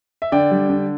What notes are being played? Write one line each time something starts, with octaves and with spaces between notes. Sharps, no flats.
E5
D3 D5 G5
G3
D3